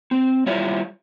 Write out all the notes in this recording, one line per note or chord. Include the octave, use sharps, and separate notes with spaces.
C4
G3 E4 F4 C#5 E5